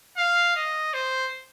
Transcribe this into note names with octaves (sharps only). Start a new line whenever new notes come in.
F5
D#5
C5